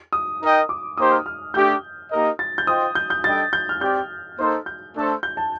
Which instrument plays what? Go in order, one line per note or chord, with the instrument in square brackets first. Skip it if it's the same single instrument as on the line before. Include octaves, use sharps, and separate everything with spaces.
[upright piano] D#6
[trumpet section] D#4 A#4 D#5 G5
[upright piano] D6
[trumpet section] A#3 D#4 G4 C5 [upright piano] D#6
[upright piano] F6
F6
[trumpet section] A3 D4 G4 [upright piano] G6
[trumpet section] A#3 D#4 G4 A#4 D#5
[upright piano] A6
G6
[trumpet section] F4 C5 D#5 G5 [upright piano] D#6
[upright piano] G6
G6
[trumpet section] G3 D4 A4 D#5 G5 [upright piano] A6
[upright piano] G6
F6
[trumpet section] C4 G4 D5 G5 [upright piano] G6
[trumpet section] A#3 D#4 A4 C5
[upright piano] G6
[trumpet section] A3 D4 A4 C5
[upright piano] G6
A5